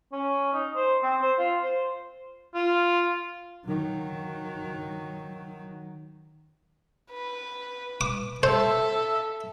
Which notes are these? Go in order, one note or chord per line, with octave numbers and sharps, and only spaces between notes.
C#4
D#4
C5
C4
C5
F4
C5
F4
D#3 F#3
B4
D6
A4 C5 E5